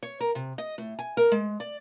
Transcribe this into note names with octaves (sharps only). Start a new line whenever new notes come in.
C#5
A#4
C3
D#5
A2
G#5
A#4
G#3
D5